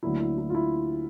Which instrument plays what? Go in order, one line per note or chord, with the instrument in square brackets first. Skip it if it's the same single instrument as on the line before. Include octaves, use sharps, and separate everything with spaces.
[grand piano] D2 D3 F#3 A#3 E4
E4
E4
F4
E4